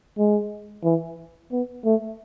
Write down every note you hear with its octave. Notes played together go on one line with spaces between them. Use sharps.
G#3
E3
B3
A3